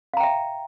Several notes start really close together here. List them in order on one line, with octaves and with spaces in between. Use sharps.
F5 A#5 G5 E5